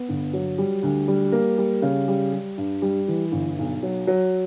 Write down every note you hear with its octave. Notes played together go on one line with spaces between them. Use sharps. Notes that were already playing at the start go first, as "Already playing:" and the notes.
Already playing: B3
G1
F#3
G3
D2
G3
A#3
G3
C#3
G3
G3
G2
G3
E3
G1
B1
F#3
F#3